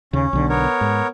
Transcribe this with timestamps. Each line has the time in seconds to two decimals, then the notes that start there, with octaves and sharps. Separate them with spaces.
0.13 D#2 C#3 C#4
0.33 B1 D3
0.49 B3 A#4 C#5
0.81 G#2